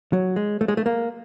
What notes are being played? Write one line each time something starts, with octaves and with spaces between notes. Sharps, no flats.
F#3
G#3
A3
G#3
A3
A#3